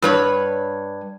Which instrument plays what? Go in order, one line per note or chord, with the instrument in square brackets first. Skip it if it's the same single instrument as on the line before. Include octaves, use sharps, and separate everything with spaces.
[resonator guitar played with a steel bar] G2 B4 C#5